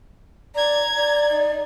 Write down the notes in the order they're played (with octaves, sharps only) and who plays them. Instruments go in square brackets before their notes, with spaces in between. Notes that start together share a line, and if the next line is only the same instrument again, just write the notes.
[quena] D5 [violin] A#5 G#6
[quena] D5
[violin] D#4